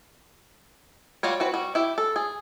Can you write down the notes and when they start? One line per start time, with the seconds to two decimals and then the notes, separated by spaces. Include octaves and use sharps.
1.23 G3 F4 F#4 C#5
1.40 C4 F#4 B4
1.54 G3 F#4
1.75 E4 G4
1.98 A4
2.16 G#4